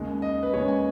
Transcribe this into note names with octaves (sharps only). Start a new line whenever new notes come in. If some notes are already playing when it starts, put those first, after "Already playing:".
Already playing: D#2 C#3 G#3
D#5
B4
D#2 C#3 G#3 C#5
G#5